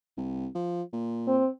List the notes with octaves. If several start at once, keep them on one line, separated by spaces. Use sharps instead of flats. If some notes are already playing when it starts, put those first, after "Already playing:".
C2
F3
A#2
C4